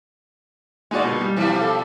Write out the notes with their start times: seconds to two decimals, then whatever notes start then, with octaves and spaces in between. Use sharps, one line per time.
0.91 A#2 G#3 D#4 F#4 D5
1.04 B2
1.21 G3
1.36 B2 E3 F3 G3
1.57 A4 F5